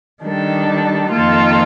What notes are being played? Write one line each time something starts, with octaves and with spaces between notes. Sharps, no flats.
D#3 G3 D4 A4
F2 D#3 A#3 F4 A4